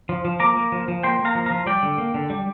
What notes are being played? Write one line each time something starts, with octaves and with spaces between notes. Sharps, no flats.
F3
F3
A#3 A#5 D6
A#3
F3
F3
A#3 G5 C6
A#3
F5 A#5
F3
F3 F5 A#5
G3 D5 G5
D3
A#3
D3
G3